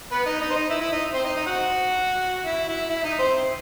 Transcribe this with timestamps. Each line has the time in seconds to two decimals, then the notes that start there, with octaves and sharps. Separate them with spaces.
0.12 B3 B4
0.26 D#4 D#5
0.41 D#4 D#5
0.51 C5
0.56 D#4 D#5
0.70 E4 E5
0.81 E4 E5
0.92 D#4 D#5
1.14 C4 C5
1.25 D#4 D#5
1.36 D#4 D#5
1.47 F#4 F#5
2.45 E4 E5
2.68 E4 E5
2.89 E4 E5
3.04 D#4 D#5
3.19 C4 C5